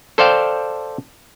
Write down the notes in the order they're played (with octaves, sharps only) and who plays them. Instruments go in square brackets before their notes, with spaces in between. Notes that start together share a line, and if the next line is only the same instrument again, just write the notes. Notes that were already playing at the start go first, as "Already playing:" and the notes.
[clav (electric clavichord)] A4 C5 D5 F5 G5